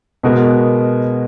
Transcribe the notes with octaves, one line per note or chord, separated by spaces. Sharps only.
B2 G#3 B3 F#4 A#4